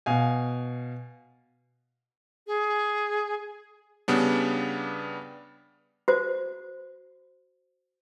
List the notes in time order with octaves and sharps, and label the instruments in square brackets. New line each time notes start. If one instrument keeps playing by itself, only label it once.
[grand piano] B2 F5 G#5
[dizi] G#4
[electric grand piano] C#3 G3 B3 D4
[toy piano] F#4 C5